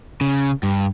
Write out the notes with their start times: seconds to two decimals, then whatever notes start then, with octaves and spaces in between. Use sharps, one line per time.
0.21 C#3
0.63 G2